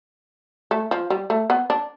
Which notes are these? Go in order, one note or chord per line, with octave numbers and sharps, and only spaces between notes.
A3
F3
G3
A3
B3
D4